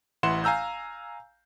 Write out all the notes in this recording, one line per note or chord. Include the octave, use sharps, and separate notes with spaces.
A1 E3 E4 F#5 C6 E7
F5 G#5 A#5 E6 G6